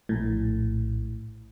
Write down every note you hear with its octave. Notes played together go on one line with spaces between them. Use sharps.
A#1 A2